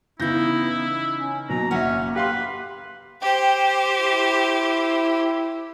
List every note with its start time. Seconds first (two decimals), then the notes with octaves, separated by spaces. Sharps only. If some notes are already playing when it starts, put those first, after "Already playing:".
0.20 C#3 E3 B3 D#4 E4 G6 A#6
1.17 C#4
1.49 B2 F#3 A#3 A#5
1.71 F#1 C#4 E5 F#5
2.16 G4 B4 F5 C6
3.22 G4 C5 G5
4.00 E4